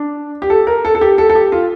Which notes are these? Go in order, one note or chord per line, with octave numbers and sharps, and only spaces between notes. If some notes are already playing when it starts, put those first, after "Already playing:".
Already playing: D4
G4
A4
A#4
A4
A4
G4
A4
A4
G4
F4